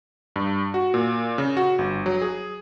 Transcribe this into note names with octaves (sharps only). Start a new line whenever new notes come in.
G2
F#4
A#2
C#3
F#4
G1
F#3
G#4